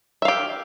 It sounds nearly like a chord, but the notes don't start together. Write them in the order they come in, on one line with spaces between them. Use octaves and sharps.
E5 F5 G4